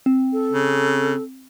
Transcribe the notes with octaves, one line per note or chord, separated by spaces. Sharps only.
C4
A4
C#3